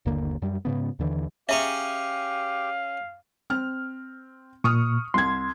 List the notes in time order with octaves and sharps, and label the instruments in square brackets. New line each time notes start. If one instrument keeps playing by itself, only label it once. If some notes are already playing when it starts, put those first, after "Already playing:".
[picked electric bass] G1 D#2 D3 A#3
F#2 G3
G#2 C#3 B3
D#2 D3 E3
[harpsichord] C#4 G#4 C#5 [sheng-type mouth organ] G4 [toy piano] E5 A#5 [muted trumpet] F5
[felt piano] C4 F6
[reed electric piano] A#2 [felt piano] C#6 D#6 F6
[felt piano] C2 G#6 [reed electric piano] C6